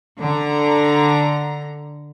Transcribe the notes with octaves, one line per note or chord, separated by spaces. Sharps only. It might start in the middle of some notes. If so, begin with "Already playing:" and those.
D3 A#5